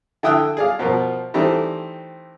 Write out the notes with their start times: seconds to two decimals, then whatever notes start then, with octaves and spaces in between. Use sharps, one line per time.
0.23 D3 E4 G5 D#6 E6 F#6
0.57 G#4 D5 F5
0.79 B2 F3 A#4
1.34 D#3 E3 G3 A3 C4